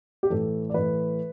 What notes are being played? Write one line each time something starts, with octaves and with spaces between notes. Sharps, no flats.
G4
A2 E3 A4
D5
A2 E3 B4